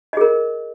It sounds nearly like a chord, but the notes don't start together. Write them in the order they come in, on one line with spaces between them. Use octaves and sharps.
D#5 G#4 A#4